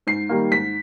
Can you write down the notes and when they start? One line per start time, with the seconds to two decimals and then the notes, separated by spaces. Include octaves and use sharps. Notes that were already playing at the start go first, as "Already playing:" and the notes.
0.07 G#2 C7
0.29 D#3 G3 A#3
0.51 G#2 B6